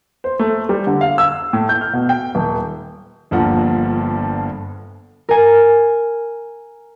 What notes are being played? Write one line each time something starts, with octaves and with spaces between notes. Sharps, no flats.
C5
A3
G3
D3
F5
E6
A2
G6
F6
B2
G5
D#1
G1 G2 F3 A#3 F#5
A#4 G#5